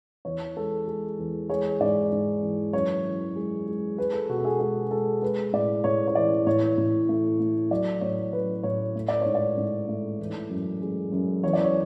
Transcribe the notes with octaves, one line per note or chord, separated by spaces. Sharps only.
E2 C#5
G#3 A4
G#3
E2
G#3 C#5
G#2 D5
G#2
E3
F#2 C#5
E3
G#3
G#3
G#3 B4
A4
B2 F#4
A4
G#4
G#3 G#4
G#3 A4
G#3 B4
A2 D5
A2 C#5
C#5
E3 D5
A2 C#5
A2
A3
A3
F#3 D5
A2 C#5
F#3 B4
A2 C#5
A3
D5
G#2 C#5
D5
G#2
A3
E3
F#2
G#3
F#2
E2 C#5
D5
C#5